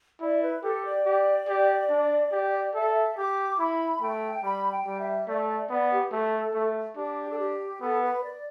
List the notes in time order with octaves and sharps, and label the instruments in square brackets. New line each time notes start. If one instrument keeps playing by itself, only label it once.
[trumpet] E4 [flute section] D5
[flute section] B4
[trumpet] G4 [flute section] A4
[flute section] D5
[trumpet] G4
G4
D4
G4
[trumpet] A4 [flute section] E5
[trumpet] G4 [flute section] D6
[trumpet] E4 [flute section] B5
[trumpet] A3 [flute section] G5
[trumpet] G3 [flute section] B5
[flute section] G5
[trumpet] G3
[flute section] E5
[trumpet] A3 [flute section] D5
[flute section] D5
[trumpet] B3 [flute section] D5
[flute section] G4
[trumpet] A3 [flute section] A4
[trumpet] A3
[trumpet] D4 [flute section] G4
[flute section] A4
G4
[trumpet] B3 [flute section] A4
[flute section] B4
D5